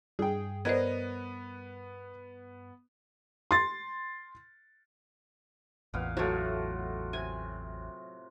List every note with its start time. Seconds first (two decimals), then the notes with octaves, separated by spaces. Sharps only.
0.19 G2 G#4 G5
0.65 B3 A#4 C5 D5 D#5 G#6
3.51 C6 A6
5.94 A1 E2 A#2 B3 F5
6.17 A2 F#3 A3 F4 F#4
7.13 C3 G#5